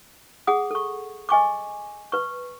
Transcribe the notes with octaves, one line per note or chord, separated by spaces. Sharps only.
G#4 F#5 D#6
A4 C#6
D#5 G#5 C#6 D6
B4 C#6